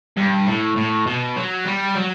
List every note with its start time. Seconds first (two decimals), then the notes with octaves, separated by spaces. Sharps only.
0.17 G2
0.47 A2
0.77 A2
1.07 B2
1.37 F#3
1.66 G3
1.96 F#3